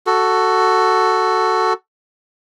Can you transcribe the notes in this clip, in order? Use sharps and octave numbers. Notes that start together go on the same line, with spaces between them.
F#4 A4